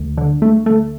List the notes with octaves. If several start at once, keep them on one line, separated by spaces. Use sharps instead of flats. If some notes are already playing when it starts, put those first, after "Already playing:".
Already playing: D2
D3
A3
A3